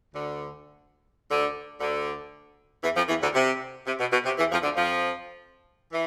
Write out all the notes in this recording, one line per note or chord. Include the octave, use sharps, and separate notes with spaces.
D2 D3
D2 D3
D2 D3
E2 E3
F2 F3
E2 E3
D2 D3
C3
C3
B2
B2
C3
E2 E3
F2 F3
D2 D3
F2 F3
E3